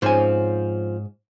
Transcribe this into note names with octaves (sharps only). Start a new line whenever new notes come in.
G#2 F3 C4 C#4 G#5